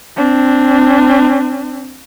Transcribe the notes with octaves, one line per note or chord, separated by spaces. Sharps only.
C4 D4